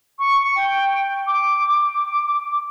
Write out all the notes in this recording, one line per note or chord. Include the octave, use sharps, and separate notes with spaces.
C#6
G5
D6
D6